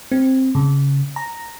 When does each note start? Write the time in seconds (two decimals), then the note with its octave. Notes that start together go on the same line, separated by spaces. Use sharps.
0.12 C4
0.55 C#3
1.16 A#5